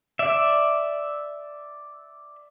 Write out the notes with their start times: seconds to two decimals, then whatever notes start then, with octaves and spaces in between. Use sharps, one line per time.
0.19 D5 E5